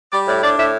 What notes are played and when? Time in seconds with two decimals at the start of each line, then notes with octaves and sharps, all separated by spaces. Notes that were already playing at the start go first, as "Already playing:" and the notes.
0.13 G3 D5
0.27 A2 D5
0.42 D4 D5
0.58 A2 E5